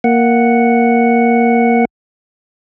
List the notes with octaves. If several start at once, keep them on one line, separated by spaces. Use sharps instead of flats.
A#3 F#5